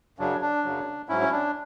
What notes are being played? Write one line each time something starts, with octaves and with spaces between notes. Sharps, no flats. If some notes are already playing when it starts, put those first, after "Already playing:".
F#2 C#3 F#3 D4
D4
F#2 C#3 F#3
G#2 F#3 C#4 E4
C#4
D4